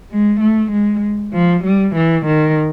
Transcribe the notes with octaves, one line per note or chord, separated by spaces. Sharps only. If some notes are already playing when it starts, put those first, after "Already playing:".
G#3
A3
G#3
F3
G3
E3
D#3